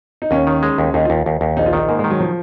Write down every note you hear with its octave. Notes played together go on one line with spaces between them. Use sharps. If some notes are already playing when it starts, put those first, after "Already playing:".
D#4
D#2 C#4
D#3
G#3
D#2
D#2 D#4
D#2 F4
D#2
D#2
A#1 D#4
F4
D#3 D#4
G#2 A#3
G#3
D#3
F#3
F3